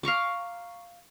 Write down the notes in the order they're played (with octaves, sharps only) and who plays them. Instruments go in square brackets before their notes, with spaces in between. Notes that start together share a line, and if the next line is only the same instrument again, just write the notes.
[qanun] F5 A#5 C#6 D6